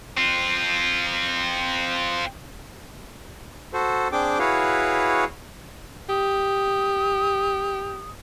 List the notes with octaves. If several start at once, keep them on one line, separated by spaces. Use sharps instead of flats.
C4 F4
F#4 A4 C5
C4 D4 G#4 G5 D6
E4 F#4 G#4 B4 C#5 F5
G4 D#6